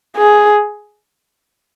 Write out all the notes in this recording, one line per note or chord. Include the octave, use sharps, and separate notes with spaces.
G#4